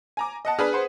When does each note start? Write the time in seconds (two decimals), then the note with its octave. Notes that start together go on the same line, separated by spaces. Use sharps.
0.17 G#5 A#5 D6
0.45 D#5 F#5 A5
0.59 D4 G#4 B4 B5 F6
0.73 C5 F#5